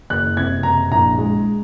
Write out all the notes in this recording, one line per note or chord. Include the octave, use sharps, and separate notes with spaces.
F#1 F#6
C3 G#6
F#1 A#5
A#1 A#5
G#3